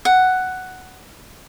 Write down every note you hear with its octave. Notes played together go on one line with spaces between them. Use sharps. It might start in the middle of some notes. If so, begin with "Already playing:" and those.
F#5